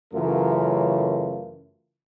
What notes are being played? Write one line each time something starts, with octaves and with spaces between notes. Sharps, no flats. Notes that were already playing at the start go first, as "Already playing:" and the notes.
F#2 C#3 E3 A3 F4 A#4